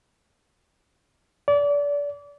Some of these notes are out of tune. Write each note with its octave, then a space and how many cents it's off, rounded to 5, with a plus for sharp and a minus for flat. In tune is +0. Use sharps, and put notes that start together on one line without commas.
D5 -30